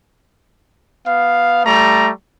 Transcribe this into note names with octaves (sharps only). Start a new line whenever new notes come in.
B3 F5
G3 A3 A#5